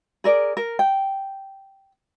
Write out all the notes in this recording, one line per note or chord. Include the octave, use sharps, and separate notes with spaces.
G#4 A#4 D5
A#4
G5